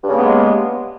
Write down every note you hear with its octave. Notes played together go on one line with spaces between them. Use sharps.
G2 C#3 G#3 A#3 B3